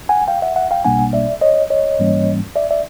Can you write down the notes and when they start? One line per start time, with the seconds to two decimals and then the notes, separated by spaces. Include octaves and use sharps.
0.09 F#5 G#5
0.28 F5 G5
0.42 E5 F#5
0.56 E5 F#5
0.71 F5 G5
0.84 B1 B2 G3 A#3 D4 F#5 G#5
1.13 D5 E5
1.41 C#5 D#5
1.70 C#5 D#5
1.99 G#2 E3 G3 A#3 C#4
2.56 D5 E5
2.71 D5 E5